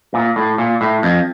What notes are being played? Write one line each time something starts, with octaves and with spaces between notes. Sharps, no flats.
A#2
A2
A#2
A2
F2